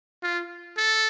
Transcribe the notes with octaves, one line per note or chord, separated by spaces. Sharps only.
F4
A4